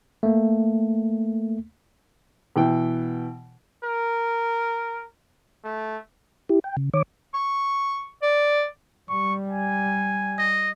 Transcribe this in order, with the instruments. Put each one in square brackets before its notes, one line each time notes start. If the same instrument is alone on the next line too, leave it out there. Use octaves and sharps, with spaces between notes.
[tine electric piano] A3 A#3
[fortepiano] B2 E3 G5
[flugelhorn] A#4
A3
[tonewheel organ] E4 G4
G5
C#3
D#3 C#5 D6
[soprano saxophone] C#6
D5
[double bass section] G3 [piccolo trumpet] C#6
[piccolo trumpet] G#5
[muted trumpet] D#5